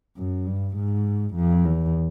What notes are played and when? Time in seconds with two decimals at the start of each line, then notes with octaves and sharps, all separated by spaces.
0.17 F#2
0.46 G2
0.76 G#2
1.35 F2
1.65 E2